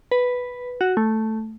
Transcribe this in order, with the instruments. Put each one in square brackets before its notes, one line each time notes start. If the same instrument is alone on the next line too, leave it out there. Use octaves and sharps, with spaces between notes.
[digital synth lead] B4
F#4
A3